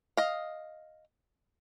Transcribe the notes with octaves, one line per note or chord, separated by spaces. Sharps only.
D#5 F5